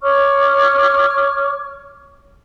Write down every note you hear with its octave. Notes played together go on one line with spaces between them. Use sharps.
C#5 C#6 D6 F6